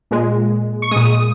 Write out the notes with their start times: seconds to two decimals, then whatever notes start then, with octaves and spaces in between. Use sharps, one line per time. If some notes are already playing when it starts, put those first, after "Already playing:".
0.11 A#2 G#3
0.82 C#6
0.91 A#2 G#3 D#6